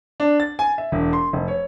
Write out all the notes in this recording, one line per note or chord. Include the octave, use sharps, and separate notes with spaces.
D4
A6
G#5
E5
E1
C6
F1
C#5